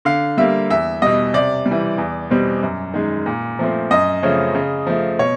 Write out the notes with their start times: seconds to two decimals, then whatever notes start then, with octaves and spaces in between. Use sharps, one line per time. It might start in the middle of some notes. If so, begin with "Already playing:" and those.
0.05 D3 F5
0.38 G3 A#3 E5
0.70 E2 E5
1.02 B2 G3 D#5
1.34 C3 D5
1.66 G3
1.71 E3
1.98 E2
2.30 B2 G3 C4
2.63 F#2
2.94 D#3 G#3
3.26 A#2
3.59 F3 A3 C4
3.91 F#2 D#5
4.23 C#3 F3 A3 C#4
4.55 C#3
4.87 F3 A3
5.19 B2 C#5